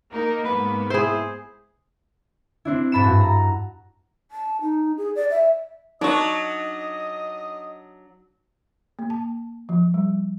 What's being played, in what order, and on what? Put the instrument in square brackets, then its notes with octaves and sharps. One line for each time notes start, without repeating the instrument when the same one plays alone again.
[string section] A#3 D#4 A#4
[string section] G#2 A#3 B3 [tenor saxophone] B4
[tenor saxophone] E4 [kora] G#4 C5
[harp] C4 D4 E4
G#2 A5 B5 D7 E7
G2 F#4
A#5
[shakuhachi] A5
D#4
G#4
D5
E5
[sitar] F#3 D4 [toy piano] D#4 [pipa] D5 C#6 [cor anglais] D#5
[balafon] A#3
A5
F3
G3